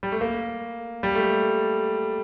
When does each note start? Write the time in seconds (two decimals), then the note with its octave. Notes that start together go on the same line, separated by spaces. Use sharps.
0.03 G3
0.12 A3
0.21 A#3
1.03 G3
1.15 A3